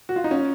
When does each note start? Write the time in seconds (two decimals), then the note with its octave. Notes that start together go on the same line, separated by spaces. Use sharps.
0.09 F#4
0.16 F4
0.24 D#4
0.31 C#4